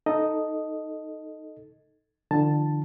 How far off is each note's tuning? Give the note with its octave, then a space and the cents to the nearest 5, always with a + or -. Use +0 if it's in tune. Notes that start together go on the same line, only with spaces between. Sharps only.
D#4 +0 A4 +0 D#5 +0
D3 +25 F3 -30 A5 +0